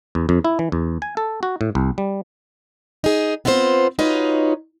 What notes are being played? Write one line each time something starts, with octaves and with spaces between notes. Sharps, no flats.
E2
F2
E4
E3
E2
G#5
A4
F#4
A2
C2
G3
D#4 G#4
B3 C4 E4 F4 C5
D#4 F4 F#4 B4 C#5 D#5